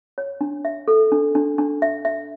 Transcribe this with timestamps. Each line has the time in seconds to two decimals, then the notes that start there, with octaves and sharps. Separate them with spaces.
0.18 C#5
0.41 D4
0.65 E5
0.88 A4
1.12 D4
1.35 D4
1.58 D4
1.82 E5
2.05 E5